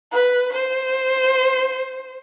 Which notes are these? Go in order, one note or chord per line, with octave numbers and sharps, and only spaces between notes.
B4
C5